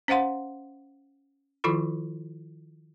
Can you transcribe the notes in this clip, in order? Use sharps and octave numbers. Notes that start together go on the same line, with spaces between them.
C#4 C5 F5 F#5 C6
D#3 F3 E4 F4 A4 B5